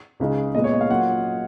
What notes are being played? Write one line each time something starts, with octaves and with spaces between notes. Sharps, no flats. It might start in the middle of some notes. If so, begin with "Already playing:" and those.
C#2 C#3 G#3 D#4
A#2 G#3 B3 D#5
C#5
D#5
F5
F#3 A#3 F4 F#5